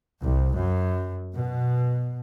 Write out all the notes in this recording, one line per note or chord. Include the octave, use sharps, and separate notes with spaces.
C2
F#2
B2